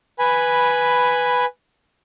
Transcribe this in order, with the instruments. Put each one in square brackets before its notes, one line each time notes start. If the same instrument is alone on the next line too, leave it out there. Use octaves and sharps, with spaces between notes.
[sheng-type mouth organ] B4 G#5 B5